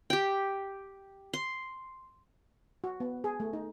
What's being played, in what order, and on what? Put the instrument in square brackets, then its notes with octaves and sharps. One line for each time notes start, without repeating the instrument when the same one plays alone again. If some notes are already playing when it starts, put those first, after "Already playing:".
[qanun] G4 G5
C6
[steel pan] F#4
B3
G#4
A3
D#4